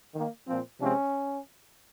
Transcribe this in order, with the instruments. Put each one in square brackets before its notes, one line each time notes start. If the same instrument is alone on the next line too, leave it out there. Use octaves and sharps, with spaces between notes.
[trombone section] D#3 A#3
A#2 F3 C4
C3 F3 G#3 C4 C#4